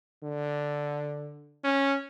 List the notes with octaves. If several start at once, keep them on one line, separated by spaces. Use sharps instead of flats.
D3
C#4